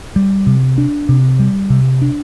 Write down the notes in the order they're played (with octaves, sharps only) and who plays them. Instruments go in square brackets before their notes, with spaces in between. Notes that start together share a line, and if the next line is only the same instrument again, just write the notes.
[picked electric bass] G3
C3
D4
C3
G3
C3
D4